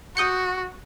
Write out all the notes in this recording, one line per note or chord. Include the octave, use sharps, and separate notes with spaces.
F#4 D#6 G6 C#7